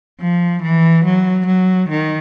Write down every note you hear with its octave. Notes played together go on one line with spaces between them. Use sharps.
F3
E3
F#3
F#3
D#3